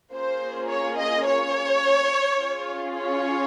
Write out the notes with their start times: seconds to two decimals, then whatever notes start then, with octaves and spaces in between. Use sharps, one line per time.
0.13 A#3 C#4 F4 G#4 C5
0.69 C#5
0.98 D#5
1.26 C#5
2.39 C#4 F4 G#4
2.96 C#5